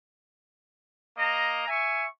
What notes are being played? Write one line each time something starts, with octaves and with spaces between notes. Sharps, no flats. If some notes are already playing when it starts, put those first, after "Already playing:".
A#3 D#5 A#5
E5 G#5 C#6